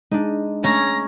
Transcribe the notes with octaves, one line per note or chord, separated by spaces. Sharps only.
G#3 D4 D#4
A3 C#4 C#5 A#5 A#6